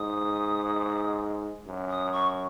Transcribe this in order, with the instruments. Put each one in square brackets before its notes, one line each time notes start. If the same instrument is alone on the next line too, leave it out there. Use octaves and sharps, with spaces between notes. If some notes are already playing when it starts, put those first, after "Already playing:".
Already playing: [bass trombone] G#2 [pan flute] D#6
[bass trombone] F#2
[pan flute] D#6
C#6